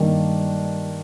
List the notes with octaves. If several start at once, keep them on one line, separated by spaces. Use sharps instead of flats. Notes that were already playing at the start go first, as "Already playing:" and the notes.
Already playing: G2 D#3 A#3 D4